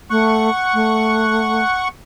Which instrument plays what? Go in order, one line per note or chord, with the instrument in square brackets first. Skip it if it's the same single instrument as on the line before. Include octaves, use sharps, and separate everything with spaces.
[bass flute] A3 [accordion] F#5 C#6
[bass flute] A3